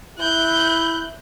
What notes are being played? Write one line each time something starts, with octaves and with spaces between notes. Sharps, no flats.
E4 F#6 G6